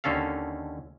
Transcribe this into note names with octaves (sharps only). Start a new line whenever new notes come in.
D#2 D3 C#4 A4 F5